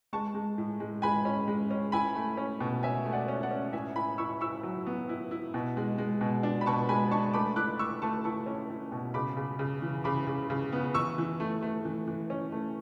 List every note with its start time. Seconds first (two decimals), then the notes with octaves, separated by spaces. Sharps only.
0.13 G#3 A5 C#6
0.34 G#3
0.58 A2
0.80 G#3
1.02 G#3 G#5 B5
1.25 C#4
1.48 G#3
1.71 C#4
1.92 E4 G#5 B5
2.15 A3
2.37 C#4
2.60 B2
2.83 C#4 E5 G#5
3.06 A3
3.13 D5 F#5
3.28 C#4
3.43 D5 F#5
3.51 C#4
3.73 A2 E5 G#5
3.96 E4 G#5 B5
4.18 E4 C#6 E6
4.41 E4 C#6 E6
4.63 F#3
4.86 B3
5.09 E4
5.31 E4
5.54 B2
5.77 G#3
5.98 G#3
6.21 B2
6.43 D4
6.61 B5
6.66 B2 A5 C#6
6.89 G#3 G#5 B5
7.11 D4 A5 C#6
7.34 A3 B5 D6
7.56 E4 D6 F#6
7.79 E4 C#6 E6
8.02 A3 A5 C#6
8.24 E4 A5 C#6
8.46 C#4
8.70 E4
8.92 B2
9.14 C#3 B5 D6
9.37 C#3
9.59 C#3
9.82 E3
10.04 C#3 B5 D6
10.27 C#3
10.50 C#3
10.72 B3
10.94 E3 C#6 E6
11.18 E3
11.40 A3
11.63 A3
11.85 E3
12.08 E3
12.30 C#4
12.52 A3